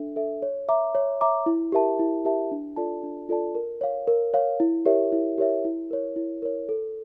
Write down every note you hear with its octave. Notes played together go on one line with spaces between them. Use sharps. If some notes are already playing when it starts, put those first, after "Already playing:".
Already playing: D4 A4 E5
A4 E5
C#5
E5 A#5 D6
C#5
E5 A#5 D6
E4
G4 A#4 E5 A5
E4
G4 A#4 E5 A5
D4
F4 A4 D5 A5
D4
F4 A4 D5 A5
A#4
C#5 F5
A#4
C#5 F5
E4
G4 A#4 C#5 E5
E4
G4 A#4 C#5 E5
E4
A#4 C#5
E4
A#4 C#5
A4